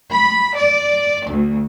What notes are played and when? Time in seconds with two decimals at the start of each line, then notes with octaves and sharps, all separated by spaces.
0.11 B5
0.57 D5
1.27 D2